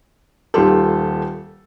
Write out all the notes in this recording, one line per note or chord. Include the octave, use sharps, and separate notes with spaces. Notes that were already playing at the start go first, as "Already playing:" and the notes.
D#1 D#3 F4 G4 A4